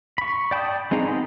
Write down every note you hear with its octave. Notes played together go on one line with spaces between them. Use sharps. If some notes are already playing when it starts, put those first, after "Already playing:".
B5 C#6
D5 G5 A5 B5 D#6
G#3 C4 D#4 G#4 A#5
B3 G4 A4